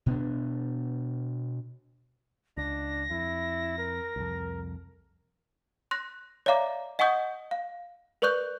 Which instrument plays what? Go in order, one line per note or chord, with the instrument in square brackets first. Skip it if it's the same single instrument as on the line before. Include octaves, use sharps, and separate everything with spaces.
[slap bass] B2 B3 D4
[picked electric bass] C#2 [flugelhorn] D4 [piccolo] A#6
[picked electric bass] F2 [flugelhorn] E4
[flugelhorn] A#4
[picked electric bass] C2 F2
[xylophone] C6 F#6 A#6
C#5 D5 E5 F5 A#5 D6
D#5 F#5 G#5 C#6 D#6 G6
F5
A#4 B4 D5 C#6 F#6 G6